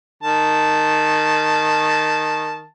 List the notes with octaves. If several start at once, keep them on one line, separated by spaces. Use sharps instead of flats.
D#3 A5